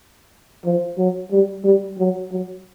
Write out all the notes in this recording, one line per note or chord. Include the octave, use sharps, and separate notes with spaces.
F3
F#3
G3
G3
F#3
F#3